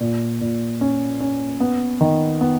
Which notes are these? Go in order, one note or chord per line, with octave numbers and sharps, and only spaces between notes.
A#2
A#2
C#4
C#4
B3
D#3
B3